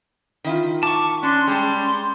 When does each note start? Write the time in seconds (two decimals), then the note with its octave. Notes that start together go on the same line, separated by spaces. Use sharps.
0.44 D#3 E4 F4
0.83 A5 C#6 D6
1.23 C#4 D4 C6
1.48 G3 G#3 A5 C6